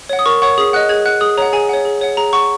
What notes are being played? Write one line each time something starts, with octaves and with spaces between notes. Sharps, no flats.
C#5 F#5
D#6
A#4 C#6
C#5 F#5 C#6
G#4 D#6
D#5 F#5 F#6
G#4 G#6
F#5 F#6
G#4 D#6
C#5 F#5 A#5
G#4 G#5
C#5 F#5
G#4
C#5 F#5
G#4 A#5
F#5 C#6